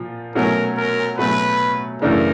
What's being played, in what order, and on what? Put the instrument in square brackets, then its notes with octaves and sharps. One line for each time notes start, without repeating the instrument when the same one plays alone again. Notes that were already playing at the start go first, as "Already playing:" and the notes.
Already playing: [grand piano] A#2 F3
[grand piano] B2 F#3 A3 C#4 [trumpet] A#4
[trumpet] A#4
[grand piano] B2 F#3 A3 C#4 [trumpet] B4
[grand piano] F#2 C#3 E3 A3 D4 [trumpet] A#4